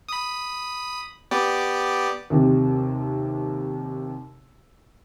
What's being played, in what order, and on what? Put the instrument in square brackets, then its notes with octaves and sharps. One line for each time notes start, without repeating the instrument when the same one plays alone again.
[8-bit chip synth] B5 D#6
B3 G4 D5
[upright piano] D#2 C3